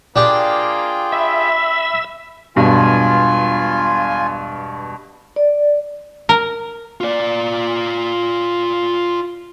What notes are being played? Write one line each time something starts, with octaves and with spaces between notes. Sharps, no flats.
A#3 D4 F4 G4 G#4 G5
E5 B5
E1 G2 B2 F4 G#5
D5
A#4
F4 D5